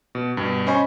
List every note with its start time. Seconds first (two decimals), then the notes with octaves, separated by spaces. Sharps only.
0.15 B2
0.37 G2 B2
0.67 C#4 C5 D#5 G#5 B5 C#6